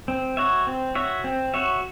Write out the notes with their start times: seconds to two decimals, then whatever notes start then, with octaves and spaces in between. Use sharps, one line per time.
0.08 C4
0.37 F#4 C#5 E5
0.67 C4
0.95 F#4 C#5 E5
1.24 C4
1.54 F#4 C#5 E5